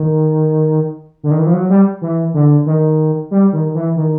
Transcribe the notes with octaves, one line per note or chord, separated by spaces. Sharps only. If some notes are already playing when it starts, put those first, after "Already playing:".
Already playing: D#3
D3
D#3
E3
F3
F#3
G3
E3
D3
D#3
G3
D#3
E3
D#3